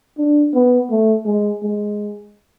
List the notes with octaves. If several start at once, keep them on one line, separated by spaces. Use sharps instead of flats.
D4
B3
A3
G#3
G#3